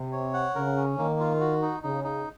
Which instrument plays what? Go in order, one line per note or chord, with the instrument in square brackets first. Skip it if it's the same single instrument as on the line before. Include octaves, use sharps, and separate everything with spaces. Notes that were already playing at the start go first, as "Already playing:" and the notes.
Already playing: [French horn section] C3
[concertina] C#5
F#5
[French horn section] C#3 [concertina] A#4
[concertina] C#4
[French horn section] D#3 [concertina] A#3
[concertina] F4
F#4
D#4
[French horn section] C#3 [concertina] D#4
[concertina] D#4